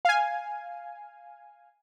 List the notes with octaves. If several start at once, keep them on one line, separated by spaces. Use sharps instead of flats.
F5 G#5